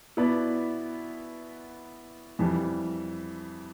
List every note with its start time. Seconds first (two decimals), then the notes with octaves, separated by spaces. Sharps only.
0.17 B2 B3 E4 B4 D5
2.39 F2 E3 G3